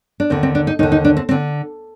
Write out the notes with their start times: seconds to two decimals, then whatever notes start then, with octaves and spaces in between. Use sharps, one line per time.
0.20 D4
0.30 D#2 D3 C4
0.43 C4
0.55 D4
0.67 D#4
0.79 D#2 D3 D#4
0.92 D#4
1.05 D4
1.17 C4
1.29 D3 C4